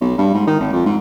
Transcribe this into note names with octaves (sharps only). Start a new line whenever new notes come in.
B1
G2
G#2
D#3
G#1
F2
G#2